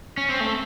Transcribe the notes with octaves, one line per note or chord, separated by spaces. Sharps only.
C#4
C4
A3